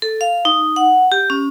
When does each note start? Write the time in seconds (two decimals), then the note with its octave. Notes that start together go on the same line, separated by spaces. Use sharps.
0.02 A4
0.21 F5
0.45 D#4
0.76 F#5
1.12 G4
1.30 C#4